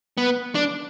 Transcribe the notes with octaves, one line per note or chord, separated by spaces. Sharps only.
B3
D4